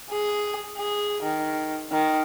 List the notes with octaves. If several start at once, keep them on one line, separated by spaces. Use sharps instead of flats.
G#4
G#4
D#3
D#3